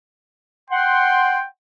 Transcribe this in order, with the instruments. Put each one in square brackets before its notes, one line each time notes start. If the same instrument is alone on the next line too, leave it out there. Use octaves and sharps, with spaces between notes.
[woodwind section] F#5 C6 [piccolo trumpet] G5